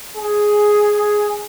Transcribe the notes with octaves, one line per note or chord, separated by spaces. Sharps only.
G#4